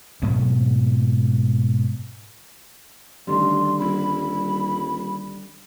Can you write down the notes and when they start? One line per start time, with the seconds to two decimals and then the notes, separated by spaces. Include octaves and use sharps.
0.22 G#2 B2 F#3 A3
3.27 A1 D3 D#3 G3 C6
3.79 D#1 B5